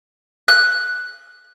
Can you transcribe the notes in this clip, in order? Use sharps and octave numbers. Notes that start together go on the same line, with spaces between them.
F#6